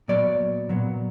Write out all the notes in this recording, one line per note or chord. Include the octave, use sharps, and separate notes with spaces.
A#2 F#3 B3 D5
A#2 F#3 B3